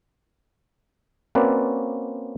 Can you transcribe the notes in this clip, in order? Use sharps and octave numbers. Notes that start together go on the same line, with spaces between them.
A#3 C4 C#4 F#4 B4 D5